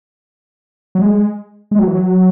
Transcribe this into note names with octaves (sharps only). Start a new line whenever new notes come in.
F#3
G#3
G#3
F#3
E3
F#3